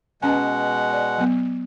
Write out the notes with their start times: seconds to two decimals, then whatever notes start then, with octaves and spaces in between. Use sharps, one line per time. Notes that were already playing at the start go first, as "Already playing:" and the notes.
0.22 B2 G#3 C#4 B4 F#5 G#5
0.93 D5
1.18 F#3 B3